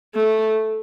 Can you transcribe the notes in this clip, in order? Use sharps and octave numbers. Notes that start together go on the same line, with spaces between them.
A3